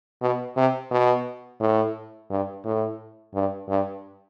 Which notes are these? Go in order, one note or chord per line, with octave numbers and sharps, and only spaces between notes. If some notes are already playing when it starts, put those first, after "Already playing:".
B2
C3
B2
A2
G2
A2
G2
G2